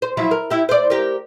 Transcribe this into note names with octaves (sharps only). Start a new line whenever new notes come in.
C5
F3 F#3 E4
A#4
E4 G4
C5 D5
G4 A#4